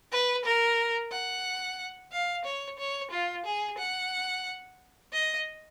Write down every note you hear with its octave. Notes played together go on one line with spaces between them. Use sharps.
B4
A#4
F#5
F5
C#5
C#5
F4
G#4
F#5
D#5